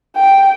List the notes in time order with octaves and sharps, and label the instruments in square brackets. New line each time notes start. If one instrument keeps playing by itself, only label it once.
[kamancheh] G5